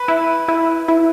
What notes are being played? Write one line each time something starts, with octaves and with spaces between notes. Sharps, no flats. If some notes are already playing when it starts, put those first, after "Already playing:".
Already playing: B4
E4
E4
E4